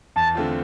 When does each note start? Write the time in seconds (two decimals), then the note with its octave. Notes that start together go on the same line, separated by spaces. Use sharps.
0.16 E2 A5
0.35 D3 A3 C4 F4